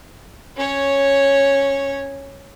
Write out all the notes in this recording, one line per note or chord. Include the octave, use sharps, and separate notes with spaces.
C#4 C#5